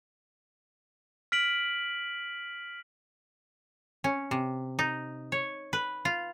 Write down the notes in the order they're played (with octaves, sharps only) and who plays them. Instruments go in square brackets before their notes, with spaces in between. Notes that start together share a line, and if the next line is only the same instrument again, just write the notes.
[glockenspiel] F6 B6 D7 F#7
[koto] C#4
C3
D#4
C#5
B4
F4